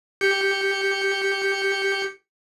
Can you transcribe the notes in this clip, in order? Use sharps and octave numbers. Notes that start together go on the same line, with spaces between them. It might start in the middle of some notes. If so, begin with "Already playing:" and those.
G4 G6 C#7